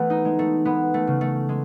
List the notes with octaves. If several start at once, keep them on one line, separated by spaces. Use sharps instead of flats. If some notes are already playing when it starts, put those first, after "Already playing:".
Already playing: E3 A3 B3
D#4
G#3
A3
G#3 B3
A3
C#3
A3
G#3